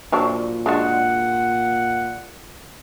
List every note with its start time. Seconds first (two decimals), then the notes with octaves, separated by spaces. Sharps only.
0.12 A#2 F3 F#3 D4
0.66 G#3 D4 F#4 F#5